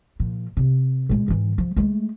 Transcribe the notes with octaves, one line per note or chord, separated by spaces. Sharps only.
A#2 F3
C3
A#2 G#3
G#2 E3
F3
G#3 A3